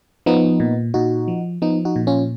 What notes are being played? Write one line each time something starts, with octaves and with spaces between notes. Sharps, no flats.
F3 B3 D#4
A#2
A#2 D#4 F#4
F3
F3 B3 D#4
D#4 F#4
A#2
C#4 F4